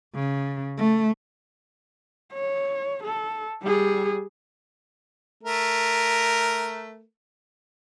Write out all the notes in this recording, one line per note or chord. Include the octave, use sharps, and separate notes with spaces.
C#3
A3
C#5
A4
G3 G#4
A3 A#4